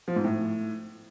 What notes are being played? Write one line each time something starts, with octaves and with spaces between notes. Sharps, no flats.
F3
G#2
A2